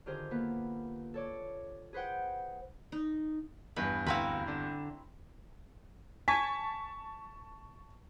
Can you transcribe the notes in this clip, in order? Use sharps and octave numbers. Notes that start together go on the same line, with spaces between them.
D3 D#3 F4 G4 G#4 C5
A#3 B3 F4 B4
A4 C#5 D5
G#4 B4 C5 F#5 G5
D#4
E2 G2 B4
D2 C4 E4 F#4 B4 F5 A#5
D3 D4
G#5 A5 C#6 B6